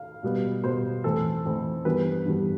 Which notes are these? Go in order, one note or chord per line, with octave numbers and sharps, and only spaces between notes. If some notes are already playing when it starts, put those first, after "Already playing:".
Already playing: F5
B2 G3 B3
B2 G3 B3 C5
F2 E3 A3 C4 A4
F2 E3 A3 C4
G2 E3 G3 B3 B4
G2 E3 G3 B3